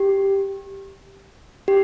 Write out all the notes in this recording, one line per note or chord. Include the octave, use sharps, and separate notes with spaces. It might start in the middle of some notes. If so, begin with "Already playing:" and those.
Already playing: G4
G4